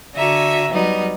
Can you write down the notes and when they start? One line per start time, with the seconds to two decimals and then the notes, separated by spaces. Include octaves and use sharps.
0.14 D3 F#4 E5 G#5 A#5
0.70 F#3 G3 B3 D#4